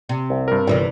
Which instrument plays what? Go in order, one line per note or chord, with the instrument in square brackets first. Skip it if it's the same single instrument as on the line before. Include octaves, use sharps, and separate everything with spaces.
[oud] C3
[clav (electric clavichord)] C2
[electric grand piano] G2 A#4
[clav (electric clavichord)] G1 [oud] C3 E3 G3